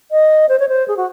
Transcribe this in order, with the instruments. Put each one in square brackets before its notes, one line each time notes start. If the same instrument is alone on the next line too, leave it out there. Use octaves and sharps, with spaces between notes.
[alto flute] D#5
C5
C#5
C5
G#4
F#4